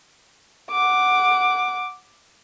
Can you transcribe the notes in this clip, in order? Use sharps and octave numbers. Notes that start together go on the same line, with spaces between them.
F#5 D6